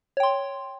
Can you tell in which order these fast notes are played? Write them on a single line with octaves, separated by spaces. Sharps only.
C#5 G5 C6